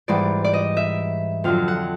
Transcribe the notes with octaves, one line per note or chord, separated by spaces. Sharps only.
G#2 E3 G3 D5
D5
D#5
E5
F2 D3 F#3 F5
F#5